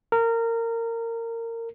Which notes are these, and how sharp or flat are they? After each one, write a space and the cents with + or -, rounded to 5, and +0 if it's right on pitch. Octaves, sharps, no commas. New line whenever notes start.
A#4 -20